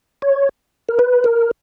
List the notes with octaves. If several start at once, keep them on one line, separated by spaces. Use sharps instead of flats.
C#5
A#4
B4
A#4